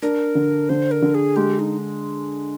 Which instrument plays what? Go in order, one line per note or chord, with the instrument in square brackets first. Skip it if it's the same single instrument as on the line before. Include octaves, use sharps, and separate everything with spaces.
[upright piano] D4 [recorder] A#4
[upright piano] D3
[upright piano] D3 [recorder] C5
[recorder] A#4
[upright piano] D3
[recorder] G#4
[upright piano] G#3 [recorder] G4
[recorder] D#4